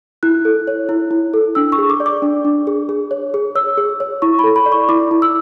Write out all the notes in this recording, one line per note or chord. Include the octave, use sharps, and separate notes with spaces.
E4 F#6
A4
C#5
E4
E4
A4
D4 E6
C#6
G#4
D6
D5
D6
D4
D4
G#4
G#4
C#5
G#4
C#5 E6
G#4
C#5
E4 C#6
A4 B5
B5
D5
C#6
E4 D6
E4
E6